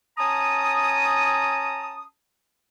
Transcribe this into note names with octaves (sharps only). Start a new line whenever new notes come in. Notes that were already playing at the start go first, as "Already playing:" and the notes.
C#4 A5 A#5 D#6